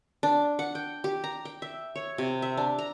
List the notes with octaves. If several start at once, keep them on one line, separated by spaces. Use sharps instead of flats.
D4
F#5
G5
G4
A#5
G5
E5
C#5
C3
E5
D4
A#5